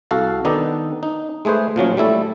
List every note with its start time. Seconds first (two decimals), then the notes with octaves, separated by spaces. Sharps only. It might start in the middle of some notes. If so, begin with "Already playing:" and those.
0.11 C2 F#4 A4 F5 A5
0.45 D#3 B3 D4 D#4 A4
1.03 D#4
1.45 G#3 A3 G#4 B4 C5
1.76 A#2 F3 F#3 C#4
1.97 G3 A3 E4 A4